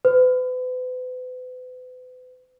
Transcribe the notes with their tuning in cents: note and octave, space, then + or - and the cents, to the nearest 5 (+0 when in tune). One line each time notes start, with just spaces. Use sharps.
B4 +40